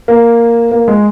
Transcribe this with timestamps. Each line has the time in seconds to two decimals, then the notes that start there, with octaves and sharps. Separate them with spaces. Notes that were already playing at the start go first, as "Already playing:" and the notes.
0.08 A#3
0.71 A#3
0.88 G#3